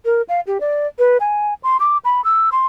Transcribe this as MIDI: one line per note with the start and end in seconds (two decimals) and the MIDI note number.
0.05 0.22 70
0.29 0.40 77
0.47 0.58 67
0.60 0.87 74
0.99 1.18 71
1.20 1.54 80
1.63 1.77 84
1.80 1.98 86
2.05 2.23 83
2.24 2.50 88
2.52 2.67 84